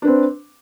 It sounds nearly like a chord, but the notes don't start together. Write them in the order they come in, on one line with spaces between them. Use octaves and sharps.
D4 B4 C4